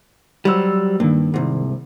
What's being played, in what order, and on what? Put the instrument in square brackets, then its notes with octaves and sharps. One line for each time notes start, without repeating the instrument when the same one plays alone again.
[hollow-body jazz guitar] F#3 G3 [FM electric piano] F#4 C5 E6
[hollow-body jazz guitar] G2 [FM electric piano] D#3 A#3
[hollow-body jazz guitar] C2 G#2